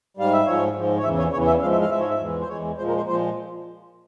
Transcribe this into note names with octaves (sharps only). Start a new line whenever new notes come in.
G#2 G3 F5
E5
G#2 F3 G#3 C#5
G#2 F3 G#3
C#5
E2 C#3 E3 E5
C#5
E2 C#3 E3 C#5
E5
G#2 F3 G#3 F5
E5
F5
G#2 F3 G#3 E5
C#5
E5
E2 E3 G#3
C5
E2 E3 G#3 C#5
A#2 F3 G#3 C5
A#4
C5
A#2 F3 G#3 C5